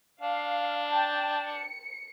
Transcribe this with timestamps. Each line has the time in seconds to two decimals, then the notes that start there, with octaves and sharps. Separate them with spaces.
0.21 D4 F5
0.88 G5 A5
1.45 C#7